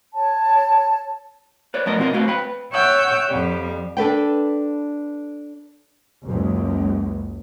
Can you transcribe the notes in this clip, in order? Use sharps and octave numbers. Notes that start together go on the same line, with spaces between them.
C#5 A5
B4 C#5 D5
F3 A3 B3 A#4 D5 D#5
C3 C4 F4 A#4 D#5
A3 C4 F#4 B4 F5
B4 G5 B5
C#5 E5 F#5 G5 E6 G6
F2 G3
D4 A4 B4 G5
F#1 C#2